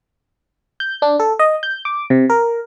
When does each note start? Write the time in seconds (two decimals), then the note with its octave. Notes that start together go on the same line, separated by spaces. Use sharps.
0.80 G6
1.02 D4
1.20 A4
1.39 D#5
1.63 G6
1.85 D6
2.10 C3
2.30 A#4